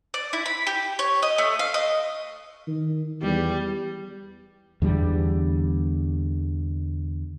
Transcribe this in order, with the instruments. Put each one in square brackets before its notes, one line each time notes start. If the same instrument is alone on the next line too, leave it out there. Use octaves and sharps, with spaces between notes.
[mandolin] D5
E4
B5
G4
C#5
D#5
A3
F5
D#5
[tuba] D#3
[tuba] E2 [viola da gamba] G3
[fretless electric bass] E2 D3 G3